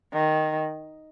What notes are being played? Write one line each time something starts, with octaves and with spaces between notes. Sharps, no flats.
D#3